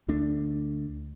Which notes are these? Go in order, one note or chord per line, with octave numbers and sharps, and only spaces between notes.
D2 A3 D4